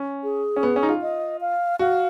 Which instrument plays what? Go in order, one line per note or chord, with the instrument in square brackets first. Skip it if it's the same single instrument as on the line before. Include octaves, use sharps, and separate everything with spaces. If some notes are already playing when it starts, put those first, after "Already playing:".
Already playing: [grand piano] C#4
[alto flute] G#4
[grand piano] C#4
B3
C#4
D#4
F4
[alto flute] D#5
F5
[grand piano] F#4 [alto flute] F5